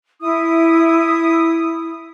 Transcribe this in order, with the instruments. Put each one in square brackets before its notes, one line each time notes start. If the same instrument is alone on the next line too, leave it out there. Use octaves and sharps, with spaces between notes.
[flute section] E4 D#6